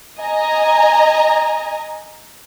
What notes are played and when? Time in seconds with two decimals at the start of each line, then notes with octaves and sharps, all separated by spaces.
0.20 D#5 G#5 A#5